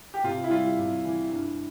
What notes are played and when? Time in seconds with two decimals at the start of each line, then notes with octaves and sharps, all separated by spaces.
0.14 G4
0.24 C3 F4
0.44 E4
0.50 G3 F4
0.78 C3
1.05 E3
1.31 G2